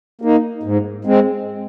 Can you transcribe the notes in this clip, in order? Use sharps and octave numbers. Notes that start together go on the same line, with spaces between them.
A#3 D#4
G#2
G#3 C4